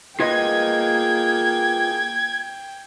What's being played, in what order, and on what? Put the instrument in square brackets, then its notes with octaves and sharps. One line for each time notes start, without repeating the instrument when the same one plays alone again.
[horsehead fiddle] A#3 G#4 [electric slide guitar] F4 B4 D#5 [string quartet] G5 [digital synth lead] G#6